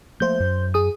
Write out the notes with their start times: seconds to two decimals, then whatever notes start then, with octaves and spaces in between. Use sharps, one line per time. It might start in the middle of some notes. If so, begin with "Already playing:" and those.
0.20 F3 A3 A#3 C5 G6
0.40 F#2
0.74 G#4 D#6